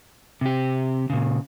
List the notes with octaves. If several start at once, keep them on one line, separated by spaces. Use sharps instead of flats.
C3 G4
A#2 C#3